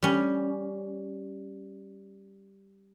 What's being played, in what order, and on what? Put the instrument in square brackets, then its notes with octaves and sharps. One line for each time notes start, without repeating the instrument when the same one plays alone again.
[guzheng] G3 C#4